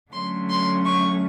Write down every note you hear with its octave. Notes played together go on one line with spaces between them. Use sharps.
D3 F#3 A3 C#4 C6
C6
C#6